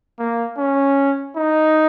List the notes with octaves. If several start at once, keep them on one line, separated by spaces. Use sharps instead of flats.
A#3
C#4
D#4